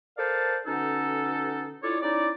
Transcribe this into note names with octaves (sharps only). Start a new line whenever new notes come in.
A4 A#4 C5 D5 F5 A5
B2 D3 C#4 D#4 A4
D4 E4 F4 A4 C#5 D5
C#4 D#4 E4 D5